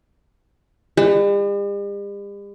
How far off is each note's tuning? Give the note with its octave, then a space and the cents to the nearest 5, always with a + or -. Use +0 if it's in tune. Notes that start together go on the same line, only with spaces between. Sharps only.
G3 +45